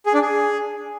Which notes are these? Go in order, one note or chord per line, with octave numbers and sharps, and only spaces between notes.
G#4
D4
G#4